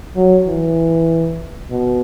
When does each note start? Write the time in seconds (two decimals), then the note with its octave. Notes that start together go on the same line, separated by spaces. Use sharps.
0.16 F#3
0.46 E3
1.70 B2